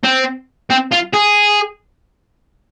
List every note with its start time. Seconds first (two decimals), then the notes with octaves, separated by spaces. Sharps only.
0.04 C4
0.70 C4
0.91 F4
1.13 G#4